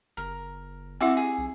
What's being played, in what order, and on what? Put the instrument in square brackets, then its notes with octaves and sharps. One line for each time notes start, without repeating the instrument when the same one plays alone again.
[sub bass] F#1 [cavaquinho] A#4
[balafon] C4 E4 [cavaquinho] F#4 E5 D6
[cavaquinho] G#4
[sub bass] B1